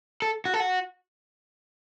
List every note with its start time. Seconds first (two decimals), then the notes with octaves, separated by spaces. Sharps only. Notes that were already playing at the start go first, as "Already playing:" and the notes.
0.22 A4
0.45 F#4
0.54 A4
0.60 F#4